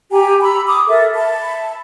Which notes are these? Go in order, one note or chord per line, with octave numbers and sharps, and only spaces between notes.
G4 G5 G#5 A#5
A#5 B5 E6
D6 D#6
A4 A#4 E5
E5 A5 B5